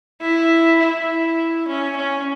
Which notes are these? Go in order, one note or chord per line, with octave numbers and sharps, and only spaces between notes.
E4
E4
C#4
C#4